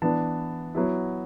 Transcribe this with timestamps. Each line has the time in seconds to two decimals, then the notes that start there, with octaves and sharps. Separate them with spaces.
0.02 E3 B3 D4 A5
0.75 F#3 B3 E4